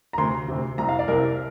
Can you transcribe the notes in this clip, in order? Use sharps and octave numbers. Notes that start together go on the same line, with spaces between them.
A#5
D2 C3 C6
D2 C3
C2 C3 A#5
F5
D5
C2 C3 A#4